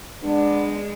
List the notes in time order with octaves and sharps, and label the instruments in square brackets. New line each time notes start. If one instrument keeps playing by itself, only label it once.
[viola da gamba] G#3 [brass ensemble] B3 D4